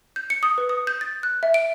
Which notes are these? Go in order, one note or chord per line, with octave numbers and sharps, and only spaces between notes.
G6
C#7
D#6
B4
D#6
G6
A6
F#6
E5
D7